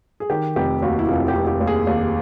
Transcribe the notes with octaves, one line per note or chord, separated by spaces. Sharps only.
G#4
D#3 G4
F1 G4
D#2 F#4
E4
F1 F4
G4
F1
G4
D#2
G#4
D#2